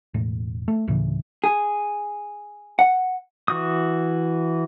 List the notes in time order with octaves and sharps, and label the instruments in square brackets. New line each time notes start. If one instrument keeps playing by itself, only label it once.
[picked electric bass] E1 A2
A3
D2 A2 C#3 E3
[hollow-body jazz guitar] G#4
F#5
[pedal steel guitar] E3 F#4 D#6